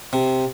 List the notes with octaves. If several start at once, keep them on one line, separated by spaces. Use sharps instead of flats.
C3